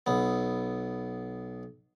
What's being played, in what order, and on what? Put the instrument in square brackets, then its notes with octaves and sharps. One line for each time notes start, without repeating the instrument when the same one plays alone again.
[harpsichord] B1 B3